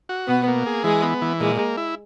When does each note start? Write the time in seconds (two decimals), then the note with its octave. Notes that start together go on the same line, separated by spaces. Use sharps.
0.09 F#4
0.28 B2 B3
0.48 A#3
0.66 G#4
0.84 E3 G#3
1.03 B3
1.22 E3
1.40 A#2 G#3
1.59 A#3
1.77 E4